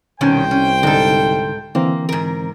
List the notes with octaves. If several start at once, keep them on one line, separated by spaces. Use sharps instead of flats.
C2 B2 D#3 C#4 C5 G5
C#4
G#2 D3 D#4 A4
D3 E3 A#3 C4
G#2 A#4